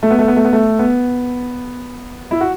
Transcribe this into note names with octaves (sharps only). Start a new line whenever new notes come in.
A3
B3
A3
B3
A3
B3
A3
B3
E4
F#4